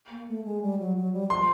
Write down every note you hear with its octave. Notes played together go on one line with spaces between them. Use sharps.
A#3
A3
G#3
G3
F#3
F#3
G3
F3 C6